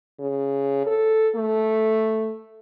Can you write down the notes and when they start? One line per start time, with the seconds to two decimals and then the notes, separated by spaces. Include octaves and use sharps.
0.19 C#3
0.87 A4
1.35 A3